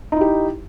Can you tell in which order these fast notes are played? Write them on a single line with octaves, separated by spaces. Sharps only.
D#4 E4 G4